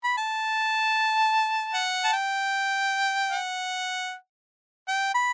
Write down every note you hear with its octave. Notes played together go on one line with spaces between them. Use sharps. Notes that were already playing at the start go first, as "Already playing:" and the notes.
B5
A5
F#5
A5
G5
F#5
G5
B5